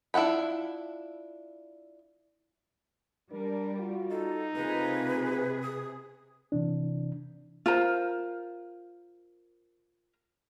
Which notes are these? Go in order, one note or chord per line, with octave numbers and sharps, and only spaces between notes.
D4 E4 F4 F#5 B5
G3 D4 A#4
F4 F#4
D#4 A4
C3 A3 A#3 F4 G#4 B4
D#6
C3 E3 D4
F4 A#4 C5 A#5